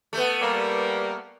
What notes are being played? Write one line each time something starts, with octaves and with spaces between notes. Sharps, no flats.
A3 B3
G3 A#3